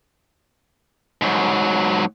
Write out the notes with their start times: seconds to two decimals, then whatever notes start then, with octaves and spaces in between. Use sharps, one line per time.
1.22 G#2 F#3